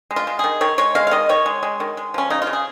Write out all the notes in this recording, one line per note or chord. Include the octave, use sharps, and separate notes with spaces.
G#3
F4
G#3
D#3 G#4
D#3 C#5
G#3 C#5
G#3 F5
F5
D#3 D#5
D#3 C#5
G#3
G#3
D#3
G#3
F3 C#4
C#3 D#4
F4
C#3
G#4